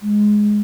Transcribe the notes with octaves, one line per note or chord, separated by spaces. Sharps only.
G#3